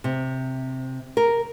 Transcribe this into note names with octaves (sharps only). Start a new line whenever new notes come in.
C3
A#4